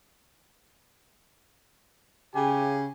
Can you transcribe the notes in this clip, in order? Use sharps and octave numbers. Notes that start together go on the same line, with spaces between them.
C#3 G4 G#5